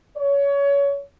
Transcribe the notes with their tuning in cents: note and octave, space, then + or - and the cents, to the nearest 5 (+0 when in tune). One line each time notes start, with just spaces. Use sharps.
C#5 +25